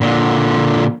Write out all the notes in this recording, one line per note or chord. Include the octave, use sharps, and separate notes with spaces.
A#2 D3